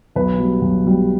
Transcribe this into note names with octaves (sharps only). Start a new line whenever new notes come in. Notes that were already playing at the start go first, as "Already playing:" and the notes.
B1 B4
B2 G3
B1
B2 G3